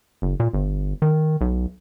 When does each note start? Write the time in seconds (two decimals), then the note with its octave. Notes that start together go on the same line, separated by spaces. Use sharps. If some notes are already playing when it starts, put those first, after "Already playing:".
0.22 F#1
0.40 A#2
0.54 G1
1.02 D#3
1.41 B1